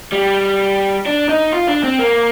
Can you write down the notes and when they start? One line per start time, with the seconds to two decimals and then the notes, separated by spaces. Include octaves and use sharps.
0.13 G3
1.06 D4
1.29 D#4
1.52 F4
1.68 D4
1.83 C4
1.99 A#3